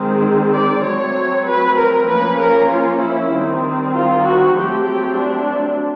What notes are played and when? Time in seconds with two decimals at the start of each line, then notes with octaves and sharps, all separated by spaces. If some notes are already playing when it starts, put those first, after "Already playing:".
Already playing: D#3 G#3 C4
0.55 D5
0.85 F#3 A3 C4 C#5
1.48 B4
1.78 A#4
2.09 F3 A#3 C#4 B4
2.40 A#4
2.70 F4
3.02 E4
3.33 D#3 G3 C4
3.94 F4
4.25 F#4
4.56 F#3 A3 C4 G4
4.87 G4
5.18 D4